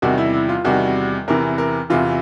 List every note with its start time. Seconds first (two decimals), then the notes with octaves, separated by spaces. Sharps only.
0.02 E2 C3 D#3 G3 F#4
0.18 E4
0.33 E4
0.49 F4
0.64 E2 C3 D#3 G3 F#4
1.28 E2 C3 E3 A#4
1.58 A#4
1.90 E2 C3 E3 F4